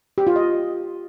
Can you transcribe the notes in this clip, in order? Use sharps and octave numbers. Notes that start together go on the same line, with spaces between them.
G4
F4
D#5